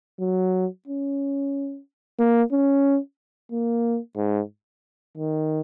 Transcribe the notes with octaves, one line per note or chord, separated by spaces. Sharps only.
F#3
C#4
A#3
C#4
A#3
G#2
D#3